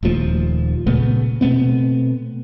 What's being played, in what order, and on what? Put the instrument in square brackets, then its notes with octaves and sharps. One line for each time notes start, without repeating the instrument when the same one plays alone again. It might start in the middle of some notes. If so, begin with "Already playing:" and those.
[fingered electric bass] D#1 D#2 F3 A3
A#2 C#3 A3 B3
B2 A3 B3 C4